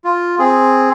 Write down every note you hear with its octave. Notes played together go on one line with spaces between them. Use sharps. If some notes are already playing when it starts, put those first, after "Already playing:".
F4
C4 G#4